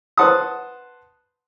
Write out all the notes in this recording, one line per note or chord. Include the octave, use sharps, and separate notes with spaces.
B4 C5 F#5 A5 C6 D#6